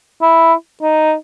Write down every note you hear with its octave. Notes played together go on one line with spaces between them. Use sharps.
E4
D#4